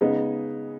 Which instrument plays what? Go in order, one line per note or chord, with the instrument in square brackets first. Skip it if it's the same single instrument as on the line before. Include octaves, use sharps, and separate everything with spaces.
[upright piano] C#3 G#3 B3 D#4